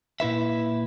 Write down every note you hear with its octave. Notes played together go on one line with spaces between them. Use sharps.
A#2 E4 B4 E5